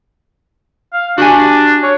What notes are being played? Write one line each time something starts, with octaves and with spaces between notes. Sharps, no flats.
F5
D4 F#4 G4 G#5
C#5